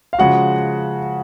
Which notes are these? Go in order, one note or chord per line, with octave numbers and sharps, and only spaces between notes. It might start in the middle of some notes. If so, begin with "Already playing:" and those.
F5
C#3 F3 G#3 F#4 F#5